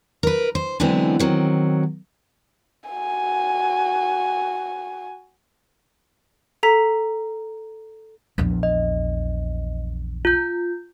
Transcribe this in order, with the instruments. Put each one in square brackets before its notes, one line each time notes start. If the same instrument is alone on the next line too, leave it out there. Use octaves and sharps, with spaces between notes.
[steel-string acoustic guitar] A#4 B4
C5
D3 E3 F#3 G#3 B3 C4
D#3 F#3 C4
[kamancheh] F#4 G#5
[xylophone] A4 A#5 B6
[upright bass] A#1 E2
[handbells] D#5
F4 G6